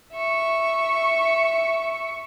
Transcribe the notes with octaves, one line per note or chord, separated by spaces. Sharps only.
E5 C#6